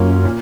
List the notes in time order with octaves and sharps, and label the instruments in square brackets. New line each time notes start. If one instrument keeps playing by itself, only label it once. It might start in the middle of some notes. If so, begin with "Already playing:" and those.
Already playing: [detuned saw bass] F#2 [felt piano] A#3 C#4 F4
[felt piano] A#2